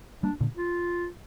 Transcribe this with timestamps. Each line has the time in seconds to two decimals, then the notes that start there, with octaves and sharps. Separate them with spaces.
0.23 G3 A#3 D4
0.40 A#2 D3
0.57 F4